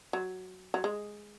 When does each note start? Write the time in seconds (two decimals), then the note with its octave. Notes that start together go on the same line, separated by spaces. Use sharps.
0.13 F#3
0.74 F#3
0.84 G#3